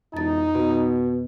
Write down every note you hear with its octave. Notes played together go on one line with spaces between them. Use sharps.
E1 F2 D#4 A6
B2 B3